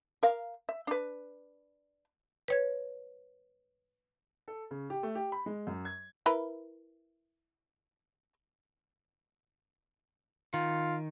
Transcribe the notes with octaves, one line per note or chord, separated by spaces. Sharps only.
A#4 F5
E5
D4 B4
B4 C#5 G#6
A4
C#3
G4
A3
G4
B5
G#3
F#2
G#6
E4 A#4 B4
D#3 F4